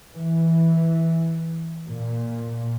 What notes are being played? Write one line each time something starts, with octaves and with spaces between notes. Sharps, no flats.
E3
A#2